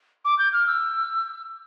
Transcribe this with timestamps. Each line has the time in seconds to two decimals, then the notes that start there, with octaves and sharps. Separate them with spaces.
0.25 D6
0.38 G6
0.53 F6
0.67 E6